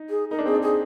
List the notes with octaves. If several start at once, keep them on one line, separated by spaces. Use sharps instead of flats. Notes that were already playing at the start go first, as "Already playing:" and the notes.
Already playing: D#4
G#4
D#4 A#4
D4
C4 G#4
D4
G#4